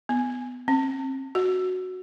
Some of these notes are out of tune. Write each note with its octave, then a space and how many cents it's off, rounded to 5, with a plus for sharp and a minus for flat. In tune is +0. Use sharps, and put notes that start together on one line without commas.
B3 +15
C4 +40
F#4 -5